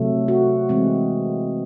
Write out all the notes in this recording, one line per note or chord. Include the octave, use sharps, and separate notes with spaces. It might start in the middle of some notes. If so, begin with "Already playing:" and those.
Already playing: C3 F#3 A3
F#4
E3 G#3 C4